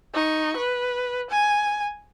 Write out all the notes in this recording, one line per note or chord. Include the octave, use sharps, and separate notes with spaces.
D#4 C#6
B4
G#5